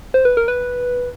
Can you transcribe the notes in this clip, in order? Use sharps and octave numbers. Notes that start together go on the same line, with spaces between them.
C5
B4
A#4
B4